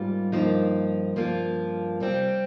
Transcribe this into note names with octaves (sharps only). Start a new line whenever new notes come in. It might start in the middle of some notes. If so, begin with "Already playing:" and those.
Already playing: G#2 G3 A#3 F4
G2 F3 A#3 D#4
G2 F3 A#3 F4
C3 G3 C4